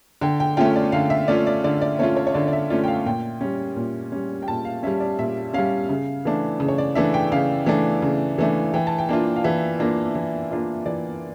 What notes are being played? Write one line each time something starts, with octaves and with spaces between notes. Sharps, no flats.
D3 G5
G5
A3 C#4 F4 G5
D5
D3 F5
E5
A3 C#4 F4 D5
D5
D3 D5
D5
A3 C#4 F4 C#5
C#5
C#5
D3 D5
D5
E5
A3 C#4 F4 D5
G5
F5
A#2 G5
G3 C#4
A#2
G3 C#4
G5
A#2 A5
F5
G3 C#4 E5
D5
A#2 E5
G3 C#4 F5
C#3
E3 A3 D4
C#3
C#5
D5
E3 A3 D4 E5
G5
C#3 F5
E3 A3 D4
C#3
E3 A3 D4
E3 G5
A5
G5
A#3 D4 F4
F5
E3 E5
A#3 D4 F4
E3
A#3 D4 F4
E3 D5